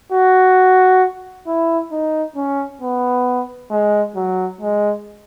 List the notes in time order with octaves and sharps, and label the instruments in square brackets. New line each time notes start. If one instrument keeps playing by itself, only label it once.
[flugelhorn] F#4
E4
D#4
C#4
B3
G#3
F#3
G#3